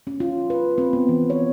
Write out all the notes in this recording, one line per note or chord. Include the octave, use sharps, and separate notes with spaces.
C#4
F4
B4
C4
B3
E3
C#5